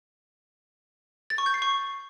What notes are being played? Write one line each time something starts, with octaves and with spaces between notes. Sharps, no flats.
A6
C#6
G6
C7
C#6